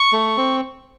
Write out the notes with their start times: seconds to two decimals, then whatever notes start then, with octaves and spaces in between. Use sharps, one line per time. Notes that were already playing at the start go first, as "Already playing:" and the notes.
Already playing: C#6
0.13 A3
0.37 C4